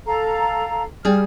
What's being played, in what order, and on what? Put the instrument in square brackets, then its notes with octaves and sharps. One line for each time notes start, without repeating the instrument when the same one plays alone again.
[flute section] A4 F5 A#5
[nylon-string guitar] G3 G#4 [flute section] F6